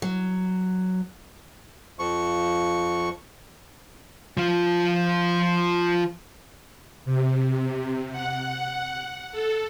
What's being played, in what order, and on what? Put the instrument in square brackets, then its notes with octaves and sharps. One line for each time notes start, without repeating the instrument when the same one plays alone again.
[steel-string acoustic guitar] F#3
[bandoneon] F2 F3 C#6
[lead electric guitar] F3 F4
[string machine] C3
F#5
A4